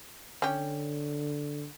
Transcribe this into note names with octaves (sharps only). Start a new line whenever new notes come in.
D3 C#4 G4